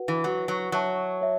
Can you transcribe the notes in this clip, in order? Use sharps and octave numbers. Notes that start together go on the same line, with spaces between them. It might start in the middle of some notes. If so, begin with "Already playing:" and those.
Already playing: F#4 B4 F#5
E3
F#3 F#4 B4 F#5
F#3
F#3 C#5 E5 A5 C#6
C#5 E5